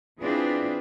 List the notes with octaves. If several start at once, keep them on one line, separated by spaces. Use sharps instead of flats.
E3 C4 D4 F4 G#4 B4